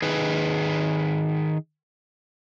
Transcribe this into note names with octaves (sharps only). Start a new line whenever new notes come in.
D#3 G#4 B4